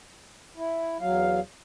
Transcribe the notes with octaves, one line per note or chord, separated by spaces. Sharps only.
E4
E2 F#3 F5